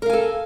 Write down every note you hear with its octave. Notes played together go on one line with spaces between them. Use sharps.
A4 A#4 F5 G#5